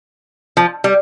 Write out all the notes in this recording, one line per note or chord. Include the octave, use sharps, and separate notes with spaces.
F3
G3